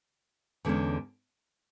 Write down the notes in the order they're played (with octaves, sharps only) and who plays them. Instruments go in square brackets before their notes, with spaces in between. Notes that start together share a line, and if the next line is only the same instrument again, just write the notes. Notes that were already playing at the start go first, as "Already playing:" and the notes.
[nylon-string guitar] E2 D3 G#3 C#4